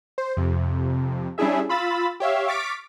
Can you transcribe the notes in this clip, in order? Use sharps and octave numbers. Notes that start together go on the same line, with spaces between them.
C5
F2 C3
G3 C#4 D4 E4 G#4 E5
F4 B5 E6 A6
G4 C#5 E5 F5
C#6 D6 F6 A6 B6 D7